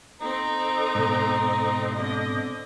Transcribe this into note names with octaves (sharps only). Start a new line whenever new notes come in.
C4 D#4 A4 A#5
G#2 B2
D3 C4 D#5